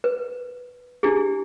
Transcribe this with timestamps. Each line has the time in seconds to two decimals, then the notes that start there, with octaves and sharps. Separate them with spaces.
0.04 B4
1.03 D4 E4 G4 G#4